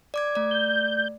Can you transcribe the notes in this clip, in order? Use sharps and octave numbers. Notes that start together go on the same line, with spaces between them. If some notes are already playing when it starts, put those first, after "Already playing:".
D5 D6 G#6
A3 D5
G6